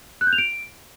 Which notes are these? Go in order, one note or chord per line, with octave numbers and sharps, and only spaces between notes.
F#6
G6
F7
D7